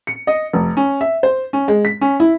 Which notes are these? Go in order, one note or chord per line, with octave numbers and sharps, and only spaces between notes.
C#7
D#5
F1
C#4
E5
C5
C#4
G#3
B6
C#4
E4